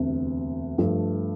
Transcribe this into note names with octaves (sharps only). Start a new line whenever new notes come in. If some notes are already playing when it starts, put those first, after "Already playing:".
Already playing: E1 D2 C3
G2 F3 A3